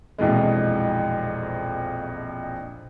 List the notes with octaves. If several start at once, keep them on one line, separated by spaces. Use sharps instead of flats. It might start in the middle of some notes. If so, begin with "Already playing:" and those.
A#1 F2 B2 E3 G#3